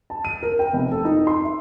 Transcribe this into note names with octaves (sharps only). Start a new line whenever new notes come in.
A5
D#7
A#4
G5
F1
A4
D#4
C6
E5